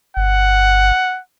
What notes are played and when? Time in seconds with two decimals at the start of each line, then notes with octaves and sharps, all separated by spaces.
0.17 G1 F#5